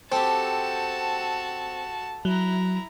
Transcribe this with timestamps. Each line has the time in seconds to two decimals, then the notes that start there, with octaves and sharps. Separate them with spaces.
0.12 C4 F#4 G4 A4 A5
2.25 F#3 E4 A#5